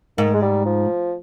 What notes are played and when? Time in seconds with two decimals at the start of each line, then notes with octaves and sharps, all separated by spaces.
0.18 G#2 D#3
0.34 G#3
0.42 G3
0.65 F3